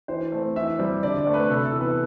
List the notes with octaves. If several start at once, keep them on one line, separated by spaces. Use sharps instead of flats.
E3 C5
A3 C4
E3 E5
G3 C4
D3 D5
D5
A3 C4
B4
C3 A4
A4
E3 B3
B4